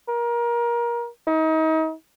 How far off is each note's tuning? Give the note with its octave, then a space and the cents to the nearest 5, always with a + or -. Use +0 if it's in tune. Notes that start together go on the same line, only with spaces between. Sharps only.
A#4 +25
D#4 +35